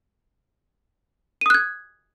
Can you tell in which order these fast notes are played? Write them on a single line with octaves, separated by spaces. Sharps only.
D#7 D#6 F#6 G#6